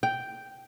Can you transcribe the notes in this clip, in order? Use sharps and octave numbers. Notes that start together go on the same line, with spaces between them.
G5